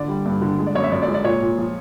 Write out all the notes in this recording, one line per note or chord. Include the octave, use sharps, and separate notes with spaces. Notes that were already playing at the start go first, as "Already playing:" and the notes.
Already playing: D3 D5
G3
G2
D3
G#3
D5
F#2 C#5
E5
F#2 D5
D5
G#3
D5
A#2 C#5
A#2
F3